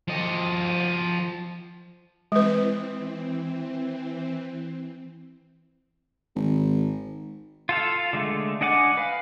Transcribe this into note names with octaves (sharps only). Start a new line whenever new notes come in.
F3 D#5
E3 G#3 C4 B4
G#1
F4 A4 F5
D3 G#3 A3
D4 D#5 F#5 G#5 D6
B4 F5